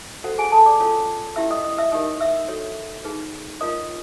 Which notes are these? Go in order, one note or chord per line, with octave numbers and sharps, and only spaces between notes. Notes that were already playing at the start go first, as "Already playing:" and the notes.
F#4 A4 C5 F#5
G#4 G#5
A4 A5
D5 D6
C#4 F4 A4 C#5
C#4 E4 G4 E5 E6
D#5 D#6
D#5 D#6
E5 E6
D#4 G4 A#4 C#5 D#5 D#6
E5 E6
F#4 A4 C#5
D#4 G#4 B4
F4 A#4 C#5 D#5 D#6